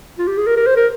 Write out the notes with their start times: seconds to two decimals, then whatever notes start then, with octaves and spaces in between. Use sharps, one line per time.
0.18 F4
0.27 G4
0.38 G#4
0.47 A#4
0.57 A#4
0.66 C5
0.77 A#4